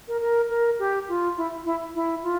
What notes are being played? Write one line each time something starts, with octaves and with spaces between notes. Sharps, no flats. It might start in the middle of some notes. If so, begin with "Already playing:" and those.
A#4
A#4
A#4
G4
F4
E4
E4
E4
F4